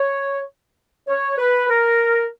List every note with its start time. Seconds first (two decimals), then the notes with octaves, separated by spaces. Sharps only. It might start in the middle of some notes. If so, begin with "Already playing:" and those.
Already playing: C#5
1.08 C#5
1.38 B4
1.70 A#4